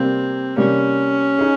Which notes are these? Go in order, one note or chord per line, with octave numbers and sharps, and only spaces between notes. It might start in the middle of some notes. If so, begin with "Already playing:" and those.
Already playing: C3 G3 A#3 C4
C3 G3 A#3 C#4
D#4 G#4